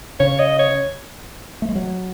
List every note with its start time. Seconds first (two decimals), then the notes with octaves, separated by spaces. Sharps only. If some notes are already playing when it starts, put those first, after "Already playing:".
0.20 C#3 C#5
0.39 D#5
0.59 C#5
1.62 A3
1.69 G#3
1.76 F#3